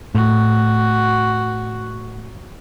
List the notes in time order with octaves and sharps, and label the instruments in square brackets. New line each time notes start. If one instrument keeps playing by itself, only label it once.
[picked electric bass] A2 [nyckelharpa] F#4